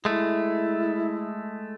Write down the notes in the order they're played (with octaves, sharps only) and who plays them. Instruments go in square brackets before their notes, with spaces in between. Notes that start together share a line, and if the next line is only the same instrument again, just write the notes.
[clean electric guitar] G#3 A3 [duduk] E4